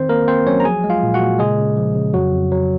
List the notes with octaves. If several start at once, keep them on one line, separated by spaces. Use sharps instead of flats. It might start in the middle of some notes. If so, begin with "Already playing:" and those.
Already playing: D#3 C4 C5
A#3 A#4
A#3 C4 C5
F#3 C#4 C#5
A#5
F3 G#4 G#5
G#3
F4 F5
A#2
F#4 F#5
A#2
C#3 G#3 G#4
C#3
F3
C#3
F2 F#3 F#4
F2
F#3